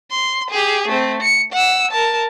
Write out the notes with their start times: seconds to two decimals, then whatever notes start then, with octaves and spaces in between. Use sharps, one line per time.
0.11 C6
0.51 G4 G#4
0.88 A3 C4
1.22 C#7
1.52 F#5 E6
1.91 A#4 A5